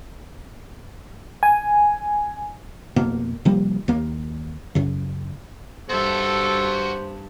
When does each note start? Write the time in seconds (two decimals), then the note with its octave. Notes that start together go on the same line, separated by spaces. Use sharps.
1.43 G#5
2.96 F1 B2 A#3
3.45 C3 F3 G3 A#3
3.88 D#2 A#3
4.75 F#2 C#3
5.89 G2 F#4 A4 C5 E5